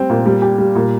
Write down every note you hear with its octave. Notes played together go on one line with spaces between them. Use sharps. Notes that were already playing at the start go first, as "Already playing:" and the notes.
Already playing: G3 C4
A#2
G3
G4
G3
A#2